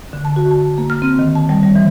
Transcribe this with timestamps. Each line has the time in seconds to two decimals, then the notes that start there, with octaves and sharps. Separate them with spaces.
0.13 D3
0.25 A5
0.36 F#4
0.51 A5
0.78 A#3
0.90 F6
1.02 C4
1.19 D#3
1.35 A5
1.49 G3
1.63 G3
1.76 E3